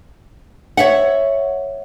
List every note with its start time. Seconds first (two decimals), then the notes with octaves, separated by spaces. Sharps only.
0.77 C#5 E5 F#5